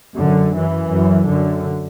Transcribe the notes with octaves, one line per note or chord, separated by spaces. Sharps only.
F#2 D3
F#2 E3
F#2
F#2 D3